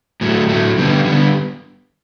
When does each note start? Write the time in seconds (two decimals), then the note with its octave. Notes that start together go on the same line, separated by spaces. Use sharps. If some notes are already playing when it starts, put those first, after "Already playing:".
0.21 A2 F#3 A3
0.49 A2 F#3 A3
0.77 D3 G3 B3
1.05 D3 G3 B3